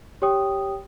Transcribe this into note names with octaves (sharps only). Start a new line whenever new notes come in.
G4 C#5 G5 D#6